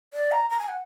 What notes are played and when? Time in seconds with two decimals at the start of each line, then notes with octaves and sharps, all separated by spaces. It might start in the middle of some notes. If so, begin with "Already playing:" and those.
0.14 D5
0.32 A#5
0.50 A#5
0.59 G#5
0.68 F#5